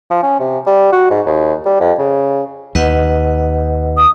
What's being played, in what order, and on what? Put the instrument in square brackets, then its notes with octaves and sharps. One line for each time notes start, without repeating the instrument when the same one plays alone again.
[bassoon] F3
C#4
C3
G3
F#4
G#2
D#2
G3
F2
C#3
[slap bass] D#2 [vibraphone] B4 D#5 F#5
[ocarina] D#6